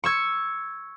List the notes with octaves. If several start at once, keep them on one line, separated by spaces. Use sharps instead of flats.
C#6 E6 G#6